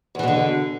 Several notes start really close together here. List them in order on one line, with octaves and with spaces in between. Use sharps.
E2 E3 B2 D3